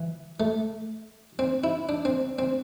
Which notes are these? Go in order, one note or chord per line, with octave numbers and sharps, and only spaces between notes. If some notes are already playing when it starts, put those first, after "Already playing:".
Already playing: E3
A3
C4
E4
D4
C4
C4